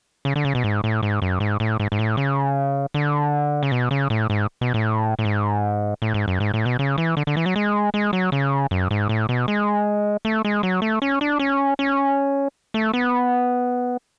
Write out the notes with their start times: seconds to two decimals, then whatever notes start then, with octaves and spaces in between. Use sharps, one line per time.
0.25 C#3
0.36 D3
0.45 C#3
0.55 B2
0.64 G#2
0.84 A2
1.03 G#2
1.22 F#2
1.40 G#2
1.60 A2
1.80 G#2
1.92 G#2
1.99 A2
2.17 C#3
2.94 D3
3.63 C#3
3.72 B2
3.91 C#3
4.10 A2
4.30 G#2
4.61 B2
4.74 A2
5.19 A2
5.25 G#2
6.02 A2
6.14 G#2
6.28 F#2
6.40 G#2
6.54 A2
6.66 B2
6.79 C#3
6.98 E3
7.17 D3
7.27 D3
7.37 E3
7.46 F#3
7.56 G#3
7.94 G#3
8.13 F#3
8.32 C#3
8.71 F#2
8.91 G#2
9.09 A2
9.29 B2
9.48 G#3
10.25 A3
10.45 G#3
10.63 F#3
10.82 A3
11.02 C#4
11.21 D4
11.39 C#4
11.79 C#4
12.74 A3
12.94 B3